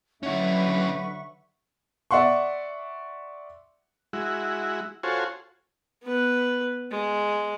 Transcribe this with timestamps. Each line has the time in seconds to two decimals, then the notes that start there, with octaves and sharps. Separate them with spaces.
0.23 D3 F#3 C#4 E4 B4 E5 F#5 C#6
2.11 D5 E5 F#5 C6 C#6
4.13 G#3 E4 F#4
5.03 F4 F#4 A4 C5 C#5 G#5
6.03 B3 B4
6.91 G#3